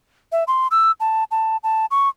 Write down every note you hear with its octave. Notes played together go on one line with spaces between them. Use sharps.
E5
C6
E6
A5
A5
A5
C#6